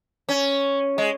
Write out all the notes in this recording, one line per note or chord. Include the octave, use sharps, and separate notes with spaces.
C#4
G#3